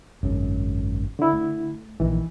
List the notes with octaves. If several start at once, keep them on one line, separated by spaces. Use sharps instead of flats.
G#1 F#2 C#3
D3 E4
A3
A#1 D#3 E3